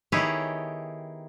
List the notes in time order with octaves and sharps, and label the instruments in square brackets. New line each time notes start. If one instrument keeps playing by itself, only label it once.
[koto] D#3 B3 E4 G4 G#4 C#5